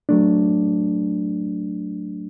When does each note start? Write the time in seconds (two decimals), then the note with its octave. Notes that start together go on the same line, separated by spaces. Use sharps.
0.09 F#3 A3 D4